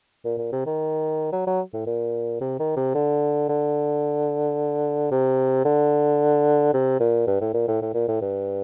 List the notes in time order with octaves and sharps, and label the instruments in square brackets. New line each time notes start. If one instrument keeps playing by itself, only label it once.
[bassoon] A#2
A#2
C3
D#3
F#3
F#3
A2
A#2
C3
D#3
C3
D3
D3
C3
D3
C3
A#2
G2
A2
A#2
A2
A2
A#2
A2
G2